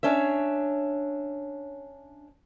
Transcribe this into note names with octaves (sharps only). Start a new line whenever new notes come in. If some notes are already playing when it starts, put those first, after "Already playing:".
C#4 D4 C#5 E5